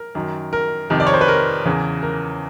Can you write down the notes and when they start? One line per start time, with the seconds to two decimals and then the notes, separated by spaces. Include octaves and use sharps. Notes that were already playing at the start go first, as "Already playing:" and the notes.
Already playing: A#4
0.15 F#2 D#3
0.53 A#4
0.90 F2 C3 D#3
1.00 D5
1.07 C#5
1.14 C5
1.21 B4
1.28 A#4
1.66 E2 C#3 E3
2.03 A#4